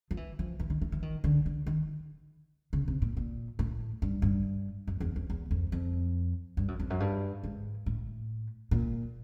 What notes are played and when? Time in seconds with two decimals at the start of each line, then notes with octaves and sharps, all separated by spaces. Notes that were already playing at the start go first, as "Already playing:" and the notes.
0.11 F3
0.17 E3
0.39 F3
0.60 E3
0.70 D#3
0.82 E3
0.92 E3
1.02 D#3
1.24 D3
1.46 D3
1.66 D#3
2.73 C#3
2.88 C3
3.02 A#2
3.17 A#2
3.59 A2
4.02 G2
4.22 G2
4.87 F#2
5.00 E2
5.16 F2
5.30 E2
5.51 F2
5.72 F2
6.57 G2
6.68 F#2
6.80 F2
6.90 F#2
7.00 G2
7.43 G#2
7.86 A2
8.71 A#2